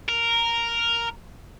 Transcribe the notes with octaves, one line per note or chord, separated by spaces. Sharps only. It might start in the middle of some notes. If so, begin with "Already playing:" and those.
A#4